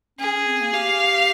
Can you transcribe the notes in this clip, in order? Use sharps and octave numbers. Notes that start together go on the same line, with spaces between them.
C#4 G#4
C#4
C4
A#3
G4 F5